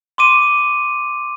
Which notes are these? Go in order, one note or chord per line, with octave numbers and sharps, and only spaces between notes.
C6 D6 D#7